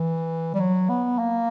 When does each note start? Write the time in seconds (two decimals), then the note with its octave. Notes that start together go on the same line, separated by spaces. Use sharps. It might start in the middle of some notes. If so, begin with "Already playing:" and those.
Already playing: E3
0.54 G3
0.60 F#3
0.89 B3
1.19 A#3